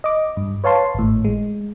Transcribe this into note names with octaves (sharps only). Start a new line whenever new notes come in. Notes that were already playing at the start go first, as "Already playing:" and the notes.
D#5 D6
G2
B4 C#5 F5 A5 C6
G#1 A2
G#3